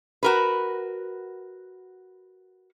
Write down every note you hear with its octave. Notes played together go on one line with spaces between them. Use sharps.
F#4 A#4 B4